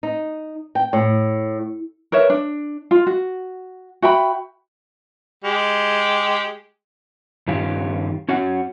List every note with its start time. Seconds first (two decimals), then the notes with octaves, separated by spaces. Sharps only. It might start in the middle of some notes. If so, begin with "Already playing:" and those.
0.03 D#4
0.75 G5
0.93 A2
2.12 A#4 B4 C#5 E5
2.30 D4
2.91 F4
3.07 F#4
4.02 F#4 E5 G5 B5
5.44 G#3 G4
7.48 G2 D#3 C#4 F4 G4
8.29 C#4 F#4 C#5 F#5